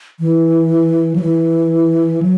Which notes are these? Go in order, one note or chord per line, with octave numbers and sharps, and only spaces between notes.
E3
F#3
E3
F#3